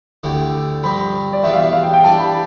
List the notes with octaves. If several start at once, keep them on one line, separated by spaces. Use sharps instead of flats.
D2 D3 A3 E4 G4
G2 F3 C4 B5
D5
E2 B2 G3 B3 F4 E5
F5
E5
F5
G5
G5
E3 G3 D4 G4 A5
B5